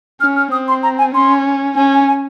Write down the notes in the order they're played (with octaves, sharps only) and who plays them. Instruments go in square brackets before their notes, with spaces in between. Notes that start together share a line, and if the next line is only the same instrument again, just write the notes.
[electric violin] C#4 [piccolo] F6
[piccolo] F6
[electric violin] C4 [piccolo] D#6
[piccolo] C6
A#5
G#5
[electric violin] C#4 [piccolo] C6
[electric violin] C#4 [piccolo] G#5
[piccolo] G#5
G#5